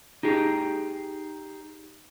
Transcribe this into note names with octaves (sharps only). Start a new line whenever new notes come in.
D#4 G4 G#4